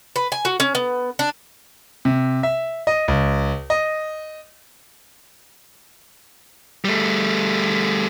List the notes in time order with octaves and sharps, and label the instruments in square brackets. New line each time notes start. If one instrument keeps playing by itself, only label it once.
[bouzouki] B4
G#5
F#4
C#4
B3
D4
[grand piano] C3
E5
D#5
C#2
D#5
[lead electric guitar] G3 A3